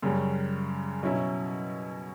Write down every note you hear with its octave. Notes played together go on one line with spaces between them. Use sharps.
F#2 C#3 G3 C#4
B2 F#3 C#4 E4